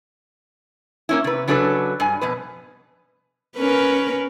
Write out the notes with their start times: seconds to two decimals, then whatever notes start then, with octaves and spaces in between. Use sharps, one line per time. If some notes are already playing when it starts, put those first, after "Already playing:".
1.09 A#3 C#4 E4
1.24 C3 B4
1.48 C#3 F#3 D4 A4 B4
2.00 G2 G#5
2.21 F2 B2 B4
3.57 C#4 A#4 B4